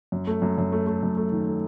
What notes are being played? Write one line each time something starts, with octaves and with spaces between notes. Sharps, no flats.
F#2
A3
F#2
F#2
A3
A3
F#2
A3
D#3
A3